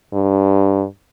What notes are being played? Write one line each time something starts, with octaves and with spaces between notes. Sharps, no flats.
G2